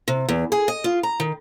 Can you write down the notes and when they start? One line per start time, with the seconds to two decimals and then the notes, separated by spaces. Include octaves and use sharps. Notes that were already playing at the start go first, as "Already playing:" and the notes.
0.08 C3
0.29 E2
0.52 G#4
0.68 D#5
0.84 F4
1.03 A#5
1.20 D#3